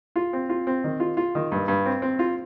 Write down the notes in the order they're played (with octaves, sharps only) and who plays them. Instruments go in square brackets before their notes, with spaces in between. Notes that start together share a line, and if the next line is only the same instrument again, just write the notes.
[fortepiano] F4
C4
F4
C4
D#3
F4
F4
D#3
G2
G2
C4
C4
F4